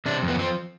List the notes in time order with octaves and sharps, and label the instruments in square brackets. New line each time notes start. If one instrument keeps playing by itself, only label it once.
[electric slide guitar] C3 D4
F2
B3
F3 C4